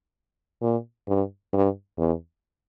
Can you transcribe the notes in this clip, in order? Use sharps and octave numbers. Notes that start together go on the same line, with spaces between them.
A#2
G2
G2
E2